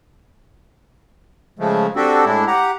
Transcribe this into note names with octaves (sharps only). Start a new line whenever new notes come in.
C#3 F3 G#3 A3
C4 D4 F#4 G4 A4
A2 G#3 D4 E4
G4 F#5 A#5